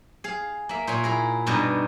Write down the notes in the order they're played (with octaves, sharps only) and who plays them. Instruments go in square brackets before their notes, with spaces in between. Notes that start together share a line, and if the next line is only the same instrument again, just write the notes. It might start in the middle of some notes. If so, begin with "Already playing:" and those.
[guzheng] G#4 F5
A#3 E5
A#2 C#5 G#5
E4 G#4 A#4
G2 B2 D4 D#4 A#5